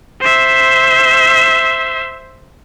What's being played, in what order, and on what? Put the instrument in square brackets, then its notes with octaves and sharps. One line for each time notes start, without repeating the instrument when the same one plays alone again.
[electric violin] C5 E5